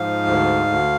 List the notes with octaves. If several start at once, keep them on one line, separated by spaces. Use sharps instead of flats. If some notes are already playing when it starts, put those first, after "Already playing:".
Already playing: G#2 F3 F5
D2
D2